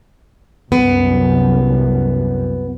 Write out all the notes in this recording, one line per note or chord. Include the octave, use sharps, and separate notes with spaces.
C2 F#2 B3